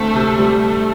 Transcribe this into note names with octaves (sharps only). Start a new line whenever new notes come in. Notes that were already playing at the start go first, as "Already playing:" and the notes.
Already playing: D2 A3 C4
C3
G3